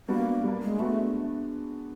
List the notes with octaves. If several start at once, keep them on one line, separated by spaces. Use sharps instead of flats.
G3 A#3 B3 D4 F#4
G3 A#3 D4
G#3
G#3 A3 B3 D4 F#4